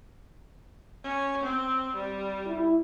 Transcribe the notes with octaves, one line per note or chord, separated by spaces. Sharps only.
C#4
C4
G3
E4